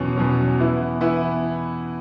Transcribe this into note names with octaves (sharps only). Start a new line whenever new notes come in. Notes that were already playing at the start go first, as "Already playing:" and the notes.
Already playing: E2 B2 F#3 C#4
E2 B2 F#3 C#4
E3 B3 E4
E3 B3 E4